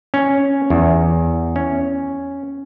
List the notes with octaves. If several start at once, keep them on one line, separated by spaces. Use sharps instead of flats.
C#4
E2
C#4